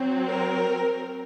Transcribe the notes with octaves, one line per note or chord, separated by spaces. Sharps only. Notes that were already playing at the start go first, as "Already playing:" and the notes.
Already playing: F#3 C4
A#4